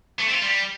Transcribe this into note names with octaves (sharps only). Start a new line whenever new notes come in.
A3
C4
F4
G3